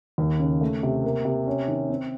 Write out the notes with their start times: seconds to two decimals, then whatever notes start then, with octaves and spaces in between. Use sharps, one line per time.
0.18 D#2
0.40 C#3
0.61 A3
0.83 C3
1.04 A#3
1.25 C3
1.47 C#4
1.68 D#3
1.90 C4